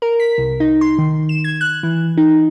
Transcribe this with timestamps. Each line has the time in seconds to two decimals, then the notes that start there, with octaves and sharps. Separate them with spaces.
0.02 A#4
0.20 B6
0.38 C2
0.60 D#4
0.81 C6
0.98 D#3
1.29 E7
1.44 G#6
1.61 F#6
1.83 E3
2.17 D#4